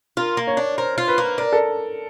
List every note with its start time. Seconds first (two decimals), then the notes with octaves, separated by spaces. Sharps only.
0.17 F4 A#4
0.37 A#3
0.47 C#5
0.57 D4
0.78 A#4 C5
0.98 F4
1.08 B4
1.18 A#3
1.38 D4 A#4
1.53 A4